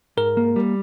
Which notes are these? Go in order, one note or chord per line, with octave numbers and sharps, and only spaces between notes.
G#2 A#4
A#3
G3